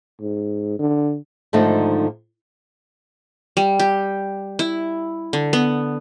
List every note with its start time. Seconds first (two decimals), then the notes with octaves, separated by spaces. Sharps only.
0.21 G#2
0.79 D3
1.53 G#2 D3 D#3 F3 A3 D#4
3.57 G3
3.80 G4
4.59 E4
5.33 D3
5.53 B3